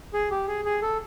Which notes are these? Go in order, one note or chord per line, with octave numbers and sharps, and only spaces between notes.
G#4
G4
G#4
G#4
A4